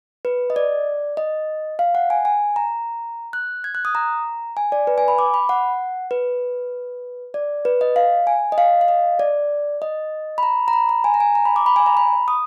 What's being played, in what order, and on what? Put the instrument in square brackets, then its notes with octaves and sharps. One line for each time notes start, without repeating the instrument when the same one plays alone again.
[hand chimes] B4
D#5
D5
D#5
F5
F#5
G#5
G#5
A#5
F#6
G#6
F#6
D#6
A#5
G#5
D5
B4
G#5
B5
D6
B5
F#5
B4
D5
B4
D#5
F5
G#5
D#5
F5
F5
D#5
D5
D#5
B5
A#5
A#5
B5
A#5
G#5
A#5
G#5
A#5
B5
D6
B5
G#5
A#5
B5
D#6